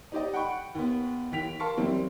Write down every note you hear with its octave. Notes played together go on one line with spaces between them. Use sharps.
D#4 G4 D5 D#5
F#5 G5 B5 C#6
D#2 B3
D#2 E3 G5 B6 F7
A#4 F5 A5 C6 C#6
F#2 E3 G3 C4